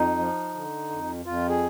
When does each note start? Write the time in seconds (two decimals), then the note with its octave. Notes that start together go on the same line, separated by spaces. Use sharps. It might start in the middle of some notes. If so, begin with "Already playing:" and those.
Already playing: F2 D#4
0.19 F3
0.54 D3
0.90 F2
1.25 F2 F4
1.49 G#4